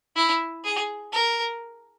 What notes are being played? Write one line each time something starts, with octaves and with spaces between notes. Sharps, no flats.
E4
G#4
A#4